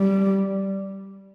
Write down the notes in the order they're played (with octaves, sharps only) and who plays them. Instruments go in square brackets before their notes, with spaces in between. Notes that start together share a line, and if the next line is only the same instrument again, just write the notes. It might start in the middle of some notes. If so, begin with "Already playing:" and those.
Already playing: [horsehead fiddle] G3